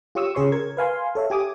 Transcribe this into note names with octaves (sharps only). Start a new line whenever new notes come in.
F4 G4 C#5 C#6 D#6 E6
C#3 G#4 C#5 C6 C#6
A#4 G#6
B4 F5 G#5 C6
A4 C#5 E5 F5
G4 G#5 D6 D#6